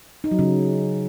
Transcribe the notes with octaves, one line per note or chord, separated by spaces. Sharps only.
D#4
F#3
C#3